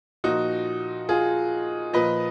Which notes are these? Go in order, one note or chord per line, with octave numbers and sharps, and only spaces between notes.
A#2 F3 D#4 F#4
F4 G#4
A#2 F3 B4 D#5